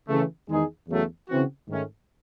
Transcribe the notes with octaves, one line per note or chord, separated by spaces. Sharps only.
C#3 E3 A3
E2 D#3 G#3 D#4 G#4
E2 C#3 F#3 A3
C#3 E3 C4 F#4
G#2 D#3 A3 C#4